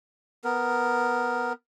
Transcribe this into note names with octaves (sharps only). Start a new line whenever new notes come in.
B3 A#4